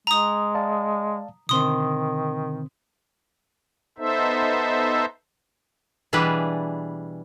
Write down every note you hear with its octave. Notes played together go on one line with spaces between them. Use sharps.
G#3 A#5 D#6
D5 F5 A5
B2 D3 D#3 C4 C6 D#6
B3 D#4 A4 C5 E5
B2 E3 G3 D4 G#4 B4